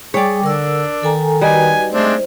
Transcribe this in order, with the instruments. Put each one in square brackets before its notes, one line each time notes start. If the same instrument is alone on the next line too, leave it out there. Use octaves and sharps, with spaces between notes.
[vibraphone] G3 G5 D6 [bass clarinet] G#4 [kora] C#5 D5
[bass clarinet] D3 [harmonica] D4 [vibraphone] A#4 E6
[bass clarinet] D#3 [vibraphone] A4 G#5 A#5
[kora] G3 D#4 [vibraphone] F#4 B4 [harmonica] G#5
[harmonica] G#3 C4 D4 [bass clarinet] A3 [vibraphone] C5